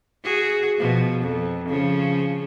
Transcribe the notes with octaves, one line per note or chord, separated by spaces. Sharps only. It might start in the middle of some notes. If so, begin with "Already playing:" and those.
F#4 G#4
B2 F3
F2
C#3 F3 C#4